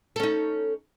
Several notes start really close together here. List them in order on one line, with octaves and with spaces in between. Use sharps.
A4 C#4 D#4